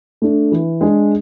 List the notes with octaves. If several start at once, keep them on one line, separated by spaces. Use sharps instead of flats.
A3 D4
E3
G#3 D4 G#4